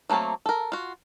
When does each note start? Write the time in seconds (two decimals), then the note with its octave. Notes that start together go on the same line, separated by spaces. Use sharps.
0.10 F#3 A3 A#3 C4 A5
0.46 A4 A#4
0.72 F4 F#4